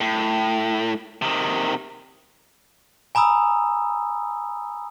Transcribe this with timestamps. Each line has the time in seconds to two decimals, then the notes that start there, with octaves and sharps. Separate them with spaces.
0.01 A2
1.22 C3 D#3
3.15 G#5 A#5 B5 D#6 E6